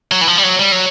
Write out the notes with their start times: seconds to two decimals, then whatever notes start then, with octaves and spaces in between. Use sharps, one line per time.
0.12 F#3
0.21 E3
0.27 F3
0.38 G3
0.43 F#3
0.59 G3
0.72 F#3